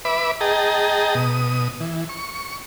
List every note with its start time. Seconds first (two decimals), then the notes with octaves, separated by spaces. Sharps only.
0.05 B4 E5 B5 D6
0.41 G#4 D#5 G5 A5 A#5
1.15 B2 D#6
1.80 E3
2.09 C#6